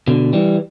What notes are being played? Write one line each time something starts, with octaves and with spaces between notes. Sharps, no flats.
B2 D3
E3 G3